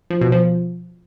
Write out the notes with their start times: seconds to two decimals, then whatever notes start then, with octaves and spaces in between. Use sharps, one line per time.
0.10 F3
0.21 B2
0.32 F3